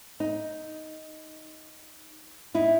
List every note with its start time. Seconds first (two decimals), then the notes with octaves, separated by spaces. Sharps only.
0.20 D#4
2.55 D#4 E4